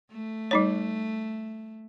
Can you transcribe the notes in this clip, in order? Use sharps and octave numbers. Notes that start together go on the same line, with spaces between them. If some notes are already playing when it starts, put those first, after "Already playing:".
A3
G3 D#4 C#5